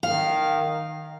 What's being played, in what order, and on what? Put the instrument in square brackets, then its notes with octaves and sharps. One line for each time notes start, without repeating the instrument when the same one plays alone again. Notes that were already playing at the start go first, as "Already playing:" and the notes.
[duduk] D#3 [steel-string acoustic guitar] F5